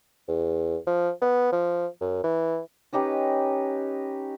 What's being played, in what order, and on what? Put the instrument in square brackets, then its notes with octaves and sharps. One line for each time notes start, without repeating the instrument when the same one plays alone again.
[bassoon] E2
F3
B3
F3
F#2
E3
[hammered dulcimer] C#4 D#4 G4 B4